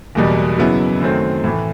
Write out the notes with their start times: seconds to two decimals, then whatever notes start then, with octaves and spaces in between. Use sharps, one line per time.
0.15 F#1 E2 B2 G3
0.58 F#2 C#3 F#3 B3 E4
1.01 F#2 D#3 F#3 A3 C4
1.44 A2 E3 A3